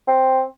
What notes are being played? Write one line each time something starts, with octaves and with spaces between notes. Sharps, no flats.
C4